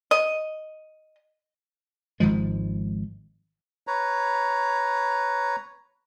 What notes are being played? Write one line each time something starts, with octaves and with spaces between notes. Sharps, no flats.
D#5
G#1 D#3 F3 G#3
B4 C#5 A#5